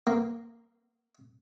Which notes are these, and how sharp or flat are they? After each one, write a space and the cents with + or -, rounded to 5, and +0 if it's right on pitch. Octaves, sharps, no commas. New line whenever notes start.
A#3 -10